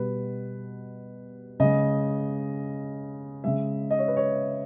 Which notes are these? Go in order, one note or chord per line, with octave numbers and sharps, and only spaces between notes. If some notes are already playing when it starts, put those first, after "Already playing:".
Already playing: B2 G3 B4
C#3 G#3 D#5
C#3 G#3 E5
D#5
C#5
B4
C#5